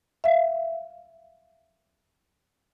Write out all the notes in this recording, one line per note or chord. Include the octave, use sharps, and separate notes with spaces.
E5 F5